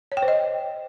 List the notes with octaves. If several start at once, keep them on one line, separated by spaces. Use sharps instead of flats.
C#5
G5
C5
D#5